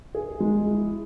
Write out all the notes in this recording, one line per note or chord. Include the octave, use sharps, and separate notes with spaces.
G#4
G#3
E4